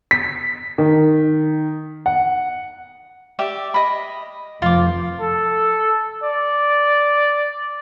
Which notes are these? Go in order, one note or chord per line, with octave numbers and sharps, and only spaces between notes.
B6
D#3
F#5
G4 D5 E5
D#5 B5
F1 F3 F4 D6
A4
D5